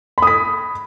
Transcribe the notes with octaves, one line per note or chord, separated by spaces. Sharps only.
B5 D#6 B6